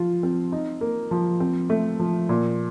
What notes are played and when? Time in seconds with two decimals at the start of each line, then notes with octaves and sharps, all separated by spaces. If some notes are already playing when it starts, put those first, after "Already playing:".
Already playing: F3 F4
0.23 C4
0.52 D#4
0.81 A#3
1.11 F3
1.40 C4
1.70 A3
2.00 F3
2.29 A#2